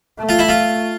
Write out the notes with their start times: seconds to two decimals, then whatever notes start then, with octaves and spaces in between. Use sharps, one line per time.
0.19 A3
0.29 F4
0.39 E4
0.49 F4